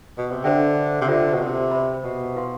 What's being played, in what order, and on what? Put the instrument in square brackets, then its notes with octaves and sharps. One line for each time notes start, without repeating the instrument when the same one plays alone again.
[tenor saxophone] B2
C3
[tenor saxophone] D3 [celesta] D4 A4 C5 E5 G5
[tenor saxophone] C3
[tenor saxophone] D3 [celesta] F4 C5 E5
[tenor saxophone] B2
C3
[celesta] C5 E5 B5
[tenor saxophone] B2
[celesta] E4 B4 F5 C6